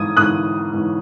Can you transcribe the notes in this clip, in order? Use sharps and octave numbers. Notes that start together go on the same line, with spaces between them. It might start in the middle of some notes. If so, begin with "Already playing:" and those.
Already playing: G#2 E3 D#6 G#6
G#2 E3 D#6 F#6
G#2 E3